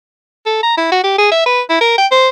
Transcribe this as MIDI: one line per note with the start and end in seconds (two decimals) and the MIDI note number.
0.46 0.61 69
0.63 0.77 82
0.78 0.89 64
0.92 1.03 66
1.04 1.16 67
1.18 1.31 68
1.32 1.43 76
1.46 1.61 71
1.70 1.80 64
1.81 1.96 70
1.98 2.06 79
2.12 2.29 72